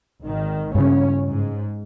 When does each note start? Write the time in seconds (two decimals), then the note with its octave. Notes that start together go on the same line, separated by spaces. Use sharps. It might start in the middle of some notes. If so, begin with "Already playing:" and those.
0.22 G#1 D#3
0.75 G2 C#3 C#4
1.27 G#2